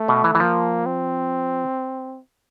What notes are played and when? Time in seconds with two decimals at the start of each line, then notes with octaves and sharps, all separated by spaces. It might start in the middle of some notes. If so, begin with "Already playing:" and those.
Already playing: A3
0.08 B2
0.24 E3
0.35 E3
0.40 F3 A#3
0.86 C4